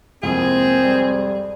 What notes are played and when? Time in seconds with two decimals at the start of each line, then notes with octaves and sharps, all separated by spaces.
0.23 C2 F2 G#3 A#3 C4 G#4
0.81 G3